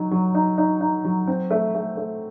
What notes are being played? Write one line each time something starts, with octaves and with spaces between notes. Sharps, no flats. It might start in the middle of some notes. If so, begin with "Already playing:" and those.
Already playing: F#3 D#4
F#3
D#4
D#4
D#4
F#3
C4
A3
A3
A3